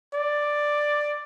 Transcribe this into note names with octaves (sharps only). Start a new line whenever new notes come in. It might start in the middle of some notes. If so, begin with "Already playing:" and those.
D5